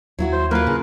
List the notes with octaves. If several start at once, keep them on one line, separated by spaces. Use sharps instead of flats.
D#2 F#3 E4 F#4
C5
F#3 A#3 F4 A#4 B4
C#3